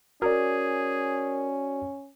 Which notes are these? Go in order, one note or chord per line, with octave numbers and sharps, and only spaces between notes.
C#4 F#4 G#4 A#4 D5